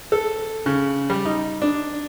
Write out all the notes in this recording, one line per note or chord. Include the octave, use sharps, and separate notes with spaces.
A4
C#3
G3
D#4
D4